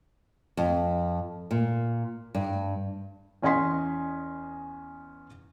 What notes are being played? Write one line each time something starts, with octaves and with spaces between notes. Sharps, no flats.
F2
A#2
G2
E2 C#4 D#5 G#5 C6 B6